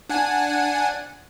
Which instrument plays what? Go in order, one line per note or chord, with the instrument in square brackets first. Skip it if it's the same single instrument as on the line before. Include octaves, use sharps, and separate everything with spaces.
[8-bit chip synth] D4 F#5 G#5